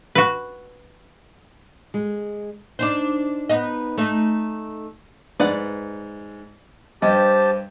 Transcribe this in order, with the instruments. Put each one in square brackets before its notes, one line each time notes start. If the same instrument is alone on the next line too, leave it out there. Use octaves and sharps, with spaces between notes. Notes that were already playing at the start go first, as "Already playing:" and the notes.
[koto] F#4 B4
[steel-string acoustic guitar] G#3
[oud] D4 D#4 C5
B3 D#4 D#5
A3 D#4
[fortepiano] G#2 [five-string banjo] B4 D5 F#5
[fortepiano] G2 D#5 [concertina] G4 A5 [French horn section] C5